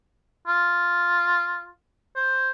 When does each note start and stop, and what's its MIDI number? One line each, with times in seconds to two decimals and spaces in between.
0.47 1.70 65
2.16 2.51 72